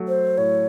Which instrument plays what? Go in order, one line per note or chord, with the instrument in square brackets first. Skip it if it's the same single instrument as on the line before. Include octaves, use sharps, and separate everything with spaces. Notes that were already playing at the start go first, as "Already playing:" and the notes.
Already playing: [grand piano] F#3 A3
[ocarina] C5
[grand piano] A2 [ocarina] C#5